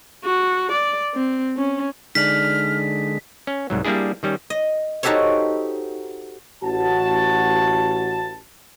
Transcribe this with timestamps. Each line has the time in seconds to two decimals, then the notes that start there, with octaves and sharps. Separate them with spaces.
0.24 F#4
0.72 D5
1.14 C4
1.57 C#4
2.15 D3 G#3 D#4 D5 F6 B6
3.47 C#4
3.70 C2 G#2 F#3
3.85 G3 A#3 D4 E4 G#4
4.23 D#3 G3 C#4
4.50 D#5
5.03 D#4 F#4 G4 A4 C5 C#5
6.63 A1 F#4 A5